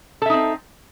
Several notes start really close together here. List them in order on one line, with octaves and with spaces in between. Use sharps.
A4 E5 D#4 C4